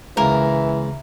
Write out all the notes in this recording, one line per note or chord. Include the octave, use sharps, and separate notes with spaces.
C#2 E3 A#3 A#4